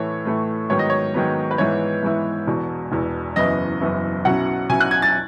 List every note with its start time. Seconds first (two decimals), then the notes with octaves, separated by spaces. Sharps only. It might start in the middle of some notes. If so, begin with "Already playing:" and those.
Already playing: A2 E3 A3 E4 C#5
0.25 A2 E3 A3 E4
0.70 G#2 D#3 F#3 B3 C#5
0.79 D#5
0.90 C#5
1.14 G#2 D#3 F#3 B3
1.51 B4
1.58 G#2 E3 B3 E4 C#5
2.03 G#2 E3 B3 E4
2.47 E1 E2 B2
2.92 E1 E2 B2
3.36 F#1 F#2 E3 B3 E4 D#5
3.80 F#1 F#2 E3 B3 E4
4.25 B1 B2 F#3 C#4 E4 F#5
4.69 B1 B2 F#3 C#4 E4 G#5
4.81 F#6
4.91 G#6
5.02 A6